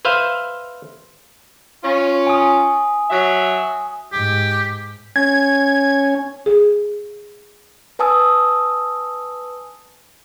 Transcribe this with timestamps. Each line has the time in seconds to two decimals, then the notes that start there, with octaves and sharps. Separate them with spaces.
0.05 B4 C5 E5 F5
1.83 C#4 F4
2.27 G#5 D#6
3.10 F#3 E5
4.12 G#2 G4
5.16 C#4 G#5 G#6
6.46 G#4
7.99 B4 G#5 A5 D#6 E6